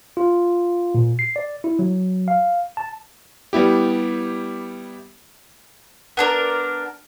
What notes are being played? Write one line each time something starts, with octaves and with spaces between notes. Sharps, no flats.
F4
A#2
C7
D5
E4
F#3
F5
A5
G3 B3 E4 G4
B3 D4 A4 A#4